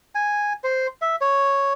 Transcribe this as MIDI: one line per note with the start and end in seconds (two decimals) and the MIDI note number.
0.15 0.53 80
0.64 0.87 72
1.02 1.16 76
1.21 1.73 73